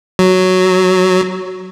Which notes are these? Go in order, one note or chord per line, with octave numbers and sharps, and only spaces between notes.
F#3